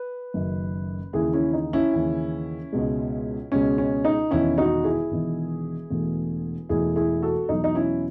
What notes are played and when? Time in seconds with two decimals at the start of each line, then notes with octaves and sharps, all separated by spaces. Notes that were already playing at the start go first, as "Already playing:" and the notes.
Already playing: B4
0.34 F#1 F#2 D#3
1.13 D#2 C#3 E3 E4 G#4
1.33 C#4 E4
1.53 D#4
1.73 C#4 E4
1.93 D#2 C#3 E3
2.72 C#2 B2 G#3
3.52 C#2 B2 G#3 C#4
3.78 C#4
4.05 D#4
4.31 E1 E2 D#3 C#4 E4
4.58 D#4 F#4
4.84 E4 G#4
5.11 E1 E2 D#3
5.90 E1 E2 B2 A3
6.69 E1 E2 B2 A3 E4 G#4
6.96 E4 G#4
7.22 F#4 A4
7.49 E2 B2 F#3 D#4
7.64 D#4
7.75 C#4 E4